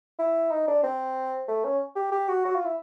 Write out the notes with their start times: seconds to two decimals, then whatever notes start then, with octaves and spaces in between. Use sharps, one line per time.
0.19 E4
0.51 D#4
0.68 D4
0.83 C4
1.48 A3
1.64 C#4
1.96 G4
2.12 G4
2.28 F#4
2.45 F#4
2.55 F4
2.65 E4